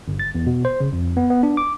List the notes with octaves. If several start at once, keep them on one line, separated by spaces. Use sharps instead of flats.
G1
A6
E2
B2
C5
C#3
F2
B3
B3
D4
D6